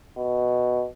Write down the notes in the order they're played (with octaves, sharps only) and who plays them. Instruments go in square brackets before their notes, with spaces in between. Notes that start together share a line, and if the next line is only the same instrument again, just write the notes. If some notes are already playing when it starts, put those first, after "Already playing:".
[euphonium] B2